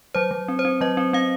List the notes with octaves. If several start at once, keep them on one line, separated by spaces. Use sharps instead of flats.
F#3 C5
F#3
C4
C5
C4
F#3 D#5
C4
C4 F5